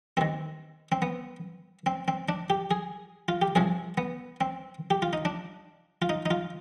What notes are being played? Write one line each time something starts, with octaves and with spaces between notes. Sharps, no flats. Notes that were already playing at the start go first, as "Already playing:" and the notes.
D#2 D#3 C4
C4
B3
C4
C4
D4
G4
G#4
F4
G4
C2 C3 F3 G#4
B3
C4
G4
F4
D#4
D4
F4
D#4
D#4
F4